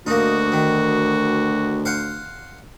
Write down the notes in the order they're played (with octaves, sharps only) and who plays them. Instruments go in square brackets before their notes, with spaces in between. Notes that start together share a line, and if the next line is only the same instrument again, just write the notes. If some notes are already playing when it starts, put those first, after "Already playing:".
[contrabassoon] D2 [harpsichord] A#3 D#4 [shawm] F#4
[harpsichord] D#3
C5 F5 F#5